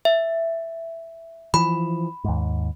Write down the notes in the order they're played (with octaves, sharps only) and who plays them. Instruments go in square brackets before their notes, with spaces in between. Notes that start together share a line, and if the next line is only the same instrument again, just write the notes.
[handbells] E5
[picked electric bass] E3 F3 [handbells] B5
[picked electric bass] D#2 G#2